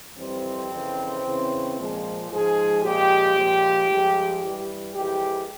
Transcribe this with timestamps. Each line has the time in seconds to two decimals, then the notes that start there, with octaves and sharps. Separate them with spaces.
0.17 F2 E3 G3 C4
0.71 F2 C#3 E3
1.23 E2 C#3 E3
1.77 A#2 F3 G#3
2.29 G#2 F3 G#3 G#4
2.82 A#2 F3 G#3 G4
3.35 A#2 F3 G#3
3.88 G2 F3 G#3
4.41 G2 E3 G3
4.94 F2 E3 G#3 G4